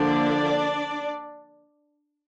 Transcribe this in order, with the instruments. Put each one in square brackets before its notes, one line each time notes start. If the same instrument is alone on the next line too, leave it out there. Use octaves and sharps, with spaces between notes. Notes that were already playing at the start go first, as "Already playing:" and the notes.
Already playing: [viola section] D3 F3 A#3 D4 D5